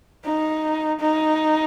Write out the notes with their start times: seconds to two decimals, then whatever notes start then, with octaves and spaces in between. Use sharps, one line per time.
0.24 D#4
1.00 D#4